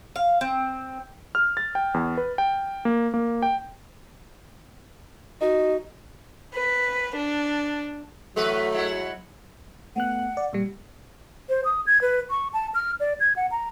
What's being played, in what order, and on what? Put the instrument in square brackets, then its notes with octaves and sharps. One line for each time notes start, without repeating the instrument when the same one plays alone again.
[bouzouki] F5
C4
[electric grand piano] F6
A6
G5
E2
B4
G5
A#3
A#3
G5
[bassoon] D#4 [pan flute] F#4
[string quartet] B4
D4
[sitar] E2 F#4 B4 [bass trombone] F#3 [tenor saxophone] A3
[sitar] G#3 E4 F#4
[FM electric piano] A3 B3 F#6 [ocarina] F#5
[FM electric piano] D5
A#2 G3
[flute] C5
D#6
G#6
B4
C#6
A5
F6
D5
G#6
F#5
A#5